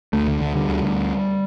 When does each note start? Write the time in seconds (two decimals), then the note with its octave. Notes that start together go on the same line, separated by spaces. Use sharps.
0.13 D2 A3
0.28 D3
0.41 D2
0.55 D3 G3
0.69 D2
0.83 D2